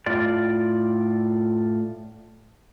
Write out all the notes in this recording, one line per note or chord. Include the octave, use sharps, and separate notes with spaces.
A2 F4 D5